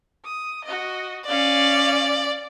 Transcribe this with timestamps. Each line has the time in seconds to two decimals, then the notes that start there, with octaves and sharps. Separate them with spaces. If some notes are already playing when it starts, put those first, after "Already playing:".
0.25 D#6
0.64 F#4 D#5
1.28 C#4 D5 F5